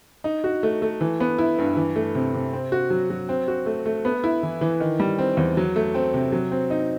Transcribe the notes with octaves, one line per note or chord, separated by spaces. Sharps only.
D#4
F#4
A3
A3
E3
B3
E4
G2
E3
A3
C3
C3
C4
F#4
F#3
F#3
C4
F#4
A3
A3
B3
E4
E3
E3
D#3
G3
C4
E2
F#3
A3
C4
C3
F#3
C4
D#4